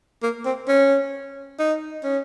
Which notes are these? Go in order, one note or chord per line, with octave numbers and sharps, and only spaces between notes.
A#3
C4
C#4
D#4
C#4